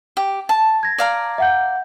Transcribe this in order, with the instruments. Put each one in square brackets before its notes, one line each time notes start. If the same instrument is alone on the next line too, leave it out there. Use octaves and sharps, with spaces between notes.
[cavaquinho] G4
A5
[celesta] G#6 A#6
[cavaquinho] D5 F5 A#5
[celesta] E5 F#5 G6